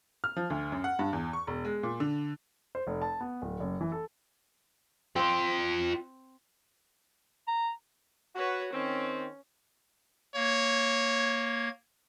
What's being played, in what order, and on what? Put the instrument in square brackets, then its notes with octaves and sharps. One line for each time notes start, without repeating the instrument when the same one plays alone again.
[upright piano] F6
F3
D2
F#2
F#5
G2
E2
C#6
E1
G#3
A#2
D3
[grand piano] C5
F1
A5
B3
D1
F#1
E3
A4
[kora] C4 [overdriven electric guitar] F4 G5
[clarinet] A#5
[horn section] F#4 [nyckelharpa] B4 C#5
[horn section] D#3 C4 [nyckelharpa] C#4
[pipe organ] A#3 G#6 [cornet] C#5